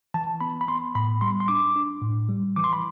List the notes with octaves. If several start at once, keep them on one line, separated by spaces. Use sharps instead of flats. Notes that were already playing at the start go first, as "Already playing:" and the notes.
E3 A5
B3 B5
B5
B3 C6
A2 B5
G3 C6
C6
D4 D6
D4
A2
G3
E3 D6
C6
B5